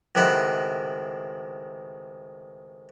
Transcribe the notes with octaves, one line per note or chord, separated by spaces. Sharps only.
C#2 A2 C3 D#3 F#5 B5